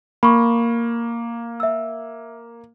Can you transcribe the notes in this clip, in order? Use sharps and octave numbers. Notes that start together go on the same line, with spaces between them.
A#3 B5 C#6
E5 E6